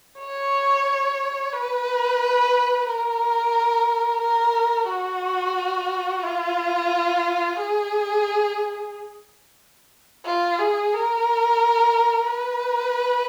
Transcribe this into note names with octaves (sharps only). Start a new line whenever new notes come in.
C#5
B4
A#4
A#4
F#4
F4
G#4
F4
G#4
A#4
B4